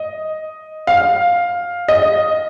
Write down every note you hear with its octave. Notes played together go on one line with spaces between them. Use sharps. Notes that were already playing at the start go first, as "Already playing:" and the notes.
Already playing: D#5
F5
D#5